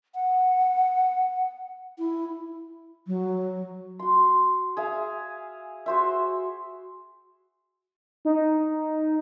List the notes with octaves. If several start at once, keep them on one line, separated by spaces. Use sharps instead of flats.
F#5
E4
F#3
F#4 C6
G#4 E5 F5
F#4 C5 E5
D#4